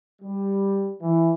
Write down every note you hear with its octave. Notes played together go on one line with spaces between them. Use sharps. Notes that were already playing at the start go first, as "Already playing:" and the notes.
G3
E3